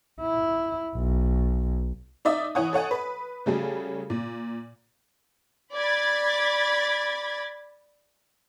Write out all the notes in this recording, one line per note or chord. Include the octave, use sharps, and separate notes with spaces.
E4
B1
D#4 D5 E5 D#6
E3 E4 C#5 F#5 G#5 D#6
A4 C#5 F#5 G#5
B4
C#3 F#3 G3 A3 G#4 A4
A#2
D5 B5 G#6 A6